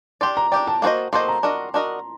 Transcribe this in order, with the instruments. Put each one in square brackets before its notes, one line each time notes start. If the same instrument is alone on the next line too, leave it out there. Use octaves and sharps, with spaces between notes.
[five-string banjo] D4 G4 D5 [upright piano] C6
[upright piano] A#5
[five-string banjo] D4 G4 D5 [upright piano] G5
[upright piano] A5
[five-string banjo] A#3 F#4 A4 C5 D#5
[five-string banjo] A#3 F#4 A4 C5 D#5 [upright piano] C6
[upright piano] A#5
[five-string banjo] D4 F#4 A#4 D#5
D4 F#4 A#4 D#5